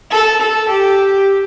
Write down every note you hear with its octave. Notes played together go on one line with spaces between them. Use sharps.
A4
A4
G4